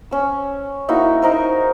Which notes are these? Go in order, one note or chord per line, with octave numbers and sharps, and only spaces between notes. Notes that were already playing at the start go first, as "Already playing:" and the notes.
C#4 E6
A#3 D#4 E4 F#4
D#4 A#4 C5